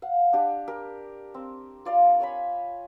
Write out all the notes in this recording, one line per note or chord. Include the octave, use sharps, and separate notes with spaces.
F5 F#5
D4 G4
G4 A#4
C4
F4 D5 F5 C6
C#5 G#5 B5